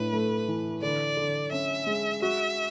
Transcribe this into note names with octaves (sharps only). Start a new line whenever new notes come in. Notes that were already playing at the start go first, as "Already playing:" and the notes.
Already playing: A2 D4 B4
A3
E3
D3 D5
D3
C#4 E5
G#3
F#4 E5